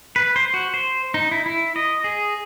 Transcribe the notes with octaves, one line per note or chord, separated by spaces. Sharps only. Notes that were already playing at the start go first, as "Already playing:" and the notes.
B4
C5
F#4
C5
D#4
E4
E4
D#5
G#4